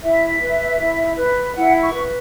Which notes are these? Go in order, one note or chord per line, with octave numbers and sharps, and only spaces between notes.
E4 E5
B4
E4
B4
E4 F#5
C#6
B4